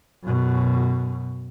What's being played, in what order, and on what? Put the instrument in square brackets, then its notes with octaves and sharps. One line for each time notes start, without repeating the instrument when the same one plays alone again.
[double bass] F#2 B2